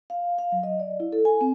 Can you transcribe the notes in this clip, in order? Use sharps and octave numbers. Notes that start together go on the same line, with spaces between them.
F5
F5
F#3
D#5
D5
E4
A4
G#5
C4